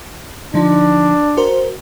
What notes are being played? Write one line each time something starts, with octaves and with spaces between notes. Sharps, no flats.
D3 F3 D4 D#4
F#4 A#4 C5